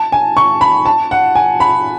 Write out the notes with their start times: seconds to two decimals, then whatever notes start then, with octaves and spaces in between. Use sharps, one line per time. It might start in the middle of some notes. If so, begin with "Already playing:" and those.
Already playing: A5
0.12 G#5
0.37 C#6
0.61 B5
0.86 A5
1.11 F#5
1.35 G#5
1.60 B5